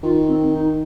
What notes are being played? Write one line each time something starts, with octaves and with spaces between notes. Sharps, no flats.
D#3 F4
C4
D#4